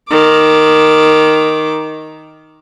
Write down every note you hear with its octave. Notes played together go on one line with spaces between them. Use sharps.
D#3 D6